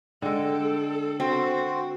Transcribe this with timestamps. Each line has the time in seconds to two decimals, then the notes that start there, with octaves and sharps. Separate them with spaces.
0.22 D3 G#3 A4 G5
1.20 C4 F#4